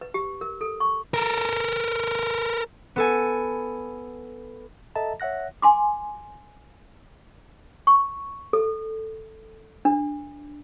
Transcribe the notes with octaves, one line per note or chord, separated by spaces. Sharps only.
B4
G4
A#4
A4
C#6
A4 A#4
B3 A4 G#5
A4 D#5 E5 A5 A#5
C#5 E5 F#5 F#6 A#6
G#5 C6 D6
C#6
A4
D4